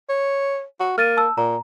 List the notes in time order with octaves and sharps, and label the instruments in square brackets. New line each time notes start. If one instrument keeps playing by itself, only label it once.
[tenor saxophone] C#5
F#4
[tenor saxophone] A#3 [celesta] F6 A6 D#7
[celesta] A5 E6
[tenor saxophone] A#2 [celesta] A#5